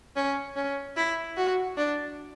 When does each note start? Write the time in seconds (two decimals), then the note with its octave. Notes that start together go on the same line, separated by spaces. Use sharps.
0.16 C#4
0.56 C#4
0.96 E4
1.37 F#4
1.77 D4